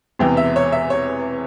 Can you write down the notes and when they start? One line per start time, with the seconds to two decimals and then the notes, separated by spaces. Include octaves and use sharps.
0.19 E1 E2 C3 E3 G5
0.37 E5
0.56 C#5
0.72 E5
0.90 C#5